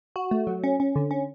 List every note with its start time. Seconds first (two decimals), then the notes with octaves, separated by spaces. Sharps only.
0.16 F#4
0.31 A3
0.47 F#3
0.64 C#4
0.80 C#4
0.96 D3
1.11 C#4